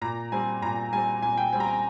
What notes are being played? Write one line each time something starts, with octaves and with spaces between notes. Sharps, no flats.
A#2 A#5
G3 C4 G#5
A#2 A#5
G3 C4 G#5
A#2 G#5
G5
G3 C4 G#5
A#5
G#5